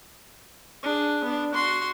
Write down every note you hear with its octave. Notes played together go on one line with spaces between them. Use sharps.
D4 G#4
B3 D4
F#4 C6